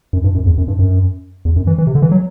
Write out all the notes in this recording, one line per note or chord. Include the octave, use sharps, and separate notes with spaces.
F#2
G2
F#2
E2
F#2
G2
F#2
E2
F#2
E3
E3
C3
D3
E3
F#3